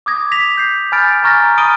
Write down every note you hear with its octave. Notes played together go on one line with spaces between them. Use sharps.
D6 D#6 G#6 A#6
A#6 B6 F7
G6 C7
G#5 B5 F6 G6 A6 D7
G#5 A#5 C#6 F6 A6 A#6
B5 D#6 F6 D7 D#7 G7